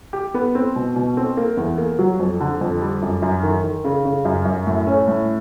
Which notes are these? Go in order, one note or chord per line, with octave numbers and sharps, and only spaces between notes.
G4
B3
C4
B2
B2
C4
A#3
E2
A#3
F#3
F2
D3
F2
G3
F#2
F#2
D#3
D#3
C#3
C#3
F#2
F#2
A2
C#4
A2